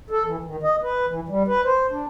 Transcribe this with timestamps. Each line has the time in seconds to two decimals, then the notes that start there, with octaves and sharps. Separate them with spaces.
0.10 A4
0.25 E3
0.44 D#3
0.63 D#5
0.83 B4
1.07 E3
1.29 G3
1.48 B4
1.64 C5
1.90 D4